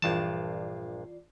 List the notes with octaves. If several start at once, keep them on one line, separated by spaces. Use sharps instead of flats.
A#1 G2 E3 F4 D5 A5